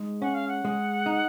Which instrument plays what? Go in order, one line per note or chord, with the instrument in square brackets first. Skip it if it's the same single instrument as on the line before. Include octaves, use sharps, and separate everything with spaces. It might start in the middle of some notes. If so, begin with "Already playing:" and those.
Already playing: [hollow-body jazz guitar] G#3 D#4
[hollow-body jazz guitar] C#4 [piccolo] F#5
[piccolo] F5
F#5
[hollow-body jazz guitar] G#3
D#4